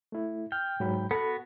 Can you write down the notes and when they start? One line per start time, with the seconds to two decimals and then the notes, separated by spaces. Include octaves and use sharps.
0.12 A3 E4
0.52 G5 F6
0.80 G#2 F#3 B5
1.11 B3 F#4 A4 B5